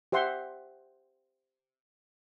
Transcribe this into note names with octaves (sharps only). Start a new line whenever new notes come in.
G4 C5 E5 F#5 C6